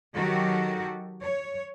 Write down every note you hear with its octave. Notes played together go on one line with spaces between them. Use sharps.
D#3 F#3 F#4 G4 A4
C#5